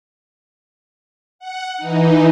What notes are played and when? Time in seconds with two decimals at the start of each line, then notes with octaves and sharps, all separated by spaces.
1.39 F#5
1.77 E3 D#4